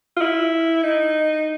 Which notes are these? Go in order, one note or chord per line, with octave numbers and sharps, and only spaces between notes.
F4
E4
D#4